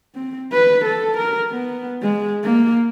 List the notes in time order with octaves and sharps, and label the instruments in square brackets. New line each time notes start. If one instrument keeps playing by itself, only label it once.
[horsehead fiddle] C4
B4
A4
A#4
B3
G#3
A#3